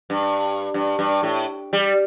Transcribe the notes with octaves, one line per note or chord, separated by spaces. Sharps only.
G2
G2
G2
A2
G3